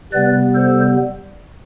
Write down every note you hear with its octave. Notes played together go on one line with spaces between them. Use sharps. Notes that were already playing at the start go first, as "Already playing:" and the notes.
C3 G3 B3 B4 D5
A4 C5